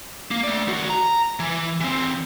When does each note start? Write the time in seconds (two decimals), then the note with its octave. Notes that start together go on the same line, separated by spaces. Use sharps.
0.31 A#3
0.44 A3 D5
0.68 D#3 F#4
0.90 A#5
1.40 E3
1.81 E3 C4